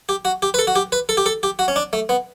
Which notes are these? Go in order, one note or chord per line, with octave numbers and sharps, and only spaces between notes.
G4
F#4
G4
B4
A4
F#4
G4
B4
A4
G4
A4
G4
F#4
C#4
D4
A3
B3